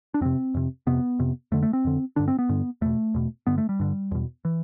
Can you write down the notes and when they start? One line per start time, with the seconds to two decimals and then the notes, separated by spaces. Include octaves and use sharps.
0.14 D4
0.21 F2 C3 C4
0.54 F2 C3
0.87 F2 C3 B3
1.19 F2 C3
1.52 F2 D3 A3
1.63 A3
1.73 C4
1.84 F2 D3
2.16 G2 D3 D4
2.28 C4
2.39 B3
2.49 G2 D3
2.81 E2 B2 A3
3.14 E2 B2
3.47 G2 D3 B3
3.58 A3
3.69 G3
3.80 G2 D3
4.11 E2 B2
4.45 E3